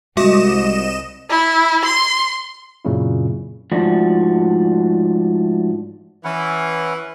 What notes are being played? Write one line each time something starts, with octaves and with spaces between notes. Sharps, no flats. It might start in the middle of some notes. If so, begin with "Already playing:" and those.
C2 G#3 F#4 D#5 D6 E7
E4
C6
F#2 A#2 C#3 F#3 C4 E4
G#2 F3 A3 D4 F#4
E3 C#4 E4 F#5